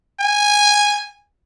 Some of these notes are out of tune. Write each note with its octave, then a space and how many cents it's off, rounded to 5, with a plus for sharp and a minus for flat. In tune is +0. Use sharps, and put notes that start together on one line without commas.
G#5 -10